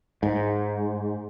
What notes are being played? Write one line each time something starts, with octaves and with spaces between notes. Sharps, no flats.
G#2